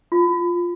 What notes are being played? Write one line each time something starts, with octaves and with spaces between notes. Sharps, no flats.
F4